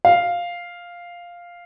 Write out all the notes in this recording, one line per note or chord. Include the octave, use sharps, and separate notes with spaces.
F5